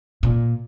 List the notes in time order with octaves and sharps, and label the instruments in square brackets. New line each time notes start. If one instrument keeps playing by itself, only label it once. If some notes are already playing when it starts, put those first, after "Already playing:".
[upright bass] A#2